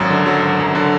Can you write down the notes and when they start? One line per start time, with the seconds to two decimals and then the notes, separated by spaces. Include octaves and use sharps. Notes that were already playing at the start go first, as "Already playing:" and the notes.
Already playing: G#1 F#2 F#3
0.10 D3
0.26 F#3
0.43 G#1
0.60 F#2
0.75 D3